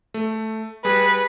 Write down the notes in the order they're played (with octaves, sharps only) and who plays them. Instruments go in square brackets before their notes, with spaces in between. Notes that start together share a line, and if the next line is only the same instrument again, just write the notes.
[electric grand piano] A3
[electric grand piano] G3 G#4 [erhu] B4